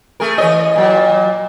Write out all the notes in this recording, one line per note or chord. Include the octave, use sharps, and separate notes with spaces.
A3 G#4 A#4
E3 C#5 D#5
A#2 F#3